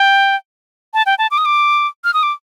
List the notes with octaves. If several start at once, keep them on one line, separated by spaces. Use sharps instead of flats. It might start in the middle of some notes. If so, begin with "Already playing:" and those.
Already playing: G5
A5
G5
A5
D6
D#6
D6
F6
D#6
D6